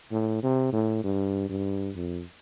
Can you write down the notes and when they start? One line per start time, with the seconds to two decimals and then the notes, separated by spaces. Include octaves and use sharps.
0.12 A2
0.43 C3
0.73 A2
1.04 G2
1.49 G2
1.95 F2